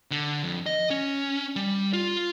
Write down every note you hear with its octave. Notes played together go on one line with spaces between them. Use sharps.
D3
F2
D#5
C#4
G3
F4